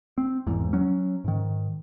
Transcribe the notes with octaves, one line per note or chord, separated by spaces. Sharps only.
C4
G#1 E2 G#2
F#3 C#4
G#2 D#3